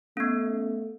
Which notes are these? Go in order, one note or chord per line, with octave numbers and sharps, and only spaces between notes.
A3 B3 C#4